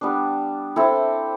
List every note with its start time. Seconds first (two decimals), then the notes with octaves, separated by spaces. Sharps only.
0.01 G3 B3 D4
0.76 C4 E4 A4